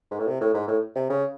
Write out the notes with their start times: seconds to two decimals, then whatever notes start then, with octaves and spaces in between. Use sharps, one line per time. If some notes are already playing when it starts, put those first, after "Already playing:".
0.11 G#2
0.19 A2
0.27 C3
0.41 A2
0.54 G#2
0.68 A2
0.96 C3
1.10 C#3